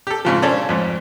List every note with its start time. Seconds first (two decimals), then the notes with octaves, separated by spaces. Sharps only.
0.07 G4 A4
0.25 G#2 C#3 F3
0.42 C#4 D4 A4 C5 C#5
0.69 F2 G#2